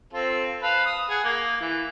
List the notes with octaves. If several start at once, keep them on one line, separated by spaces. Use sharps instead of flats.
C4 F4 A4
B4 F5 A5
D#6
G#4 F#5
A#3
E3